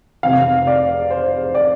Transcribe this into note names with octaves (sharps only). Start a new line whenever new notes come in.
F1 F2 C3 F5
D5
C5
D5